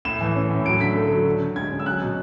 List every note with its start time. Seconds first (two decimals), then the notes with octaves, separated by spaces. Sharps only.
0.05 A2 E7
0.21 E3
0.35 C#4
0.50 A2
0.65 F#3 D7
0.81 D3 B6
0.96 A3
1.11 F#3
1.26 D3
1.41 D3
1.56 G#3 G#6
1.72 C#4
1.79 E6
1.86 F#3 F#6
2.02 B2